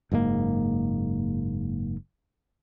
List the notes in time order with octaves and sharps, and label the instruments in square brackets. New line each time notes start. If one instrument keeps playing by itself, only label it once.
[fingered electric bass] F#1 G#2 B2 A#3